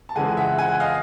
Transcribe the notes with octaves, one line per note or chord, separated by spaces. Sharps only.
A5
F2 C#3 E3 G#3 F#5 G#5
E5 F#5
F#5 G#5
D#5 F5